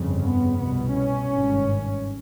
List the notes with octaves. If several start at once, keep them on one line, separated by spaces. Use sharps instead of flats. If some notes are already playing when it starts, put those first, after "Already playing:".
Already playing: G1 F2 C#3
B3
C2 B2 B3
C#4
G#1 G2